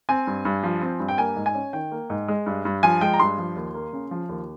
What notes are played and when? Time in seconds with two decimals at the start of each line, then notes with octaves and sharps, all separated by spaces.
0.09 C4 G#5
0.27 G2
0.45 G2
0.63 F3
0.82 C4
1.00 G2
1.08 G5
1.18 A#3 G#5
1.36 G#2
1.46 G#5
1.55 C#4
1.73 D#3 G5
1.92 A#3
2.10 G#2
2.28 G#3
2.46 G2
2.65 G2
2.83 F3 G#5
3.01 G#3 G5
3.14 A#5
3.20 G2 C6
3.38 F3
3.56 D#2
3.74 A#3
3.93 C#3
4.11 F3
4.29 D#2